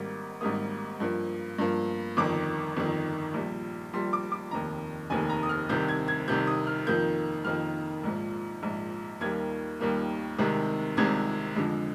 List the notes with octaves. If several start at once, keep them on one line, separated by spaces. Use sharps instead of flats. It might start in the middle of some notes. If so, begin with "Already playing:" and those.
Already playing: G#1 G#2 G3 A#3
G#1 G#2 G3 A#3 D#6
G2 F3 A#3
G2 F3 A#3
G1 F2 D#3 D6
G1 F2 D#3
A#1 A#2 G3
A#1 A#2 G3 C6
D6
D6
F1 D#2 D#3 A#5
F1 D#2 D#3 G#5
A#5
D#6
F6
C2 C3 D#3 G6
G#6
G#6
C2 C3 D#3 G6
D#6
F6
F2 D#3 A#3 G6
F2 D#3 A#3 F6
A#1 G#2 F3
A#1 G#2 F3
D#2 D#3 G3 A#3 G#6
D#2 D#3 G3 A#3
C2 C3 D#3 G#3
C2 C3 D#3 G#3 G#6
F2 D3 G#3